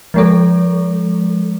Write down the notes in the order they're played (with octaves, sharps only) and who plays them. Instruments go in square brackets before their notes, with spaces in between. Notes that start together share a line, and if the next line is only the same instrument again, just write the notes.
[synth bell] F3 G#3 A4